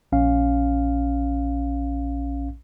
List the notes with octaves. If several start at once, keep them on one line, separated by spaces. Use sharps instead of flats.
A#1 C#4 F5